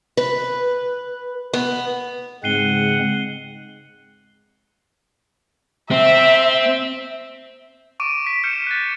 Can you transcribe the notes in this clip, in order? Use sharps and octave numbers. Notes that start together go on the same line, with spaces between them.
B4
B3
G#2 C#3 G#3 C4 F#5 C7 D#7 G7
C4 E5
C#6 D6 D7 D#7
B6
F6 G6 C#7 E7
F#6 A6